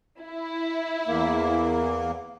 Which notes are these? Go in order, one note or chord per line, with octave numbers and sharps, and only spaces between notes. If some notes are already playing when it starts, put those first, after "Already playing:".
E4
E2 A#3